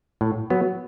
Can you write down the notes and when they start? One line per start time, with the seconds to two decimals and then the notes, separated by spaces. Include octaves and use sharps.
0.21 A2
0.50 F#3 B3